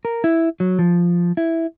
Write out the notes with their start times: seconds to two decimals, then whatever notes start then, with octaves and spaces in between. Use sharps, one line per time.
0.05 A#4
0.24 E4
0.60 F#3
0.79 F3
1.37 E4